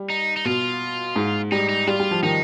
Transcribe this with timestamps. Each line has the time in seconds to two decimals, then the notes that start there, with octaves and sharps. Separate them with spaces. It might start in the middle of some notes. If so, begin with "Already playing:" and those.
Already playing: G3
0.10 D#4
0.36 D#4
0.45 B2 F4
1.16 G#2
1.52 G3 D#4
1.69 D#4
1.87 G3 F4
2.00 G3
2.11 F3
2.23 D#3 D#4